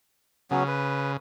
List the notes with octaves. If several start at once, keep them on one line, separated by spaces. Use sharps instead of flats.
C#3 F#3 B3 C#4
B4